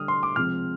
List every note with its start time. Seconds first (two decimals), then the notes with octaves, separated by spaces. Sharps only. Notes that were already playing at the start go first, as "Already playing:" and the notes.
Already playing: D3 G3 D#6 F6
0.08 C6
0.23 D6
0.36 C3 F3 G#3 F6